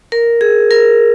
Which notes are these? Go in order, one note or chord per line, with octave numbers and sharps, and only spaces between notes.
A#4
G#4
A#4